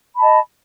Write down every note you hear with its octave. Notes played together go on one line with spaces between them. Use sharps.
D#5 A5 B5